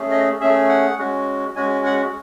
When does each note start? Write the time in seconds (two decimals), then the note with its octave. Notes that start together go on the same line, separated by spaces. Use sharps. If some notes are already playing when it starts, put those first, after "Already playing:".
Already playing: A3 C#4 G#4
0.11 D#5
0.40 A3 C#4 G#4 E5
0.69 F#5
0.98 G#3 C#4 F#4
1.56 G#3 C#4 F#4 G#5
1.85 F#5